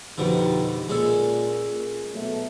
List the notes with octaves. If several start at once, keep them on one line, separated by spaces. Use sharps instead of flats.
A#1 F2 B2 D3 D#4 G4
A#2 G#3 C#4 A4
B2 F#3 A3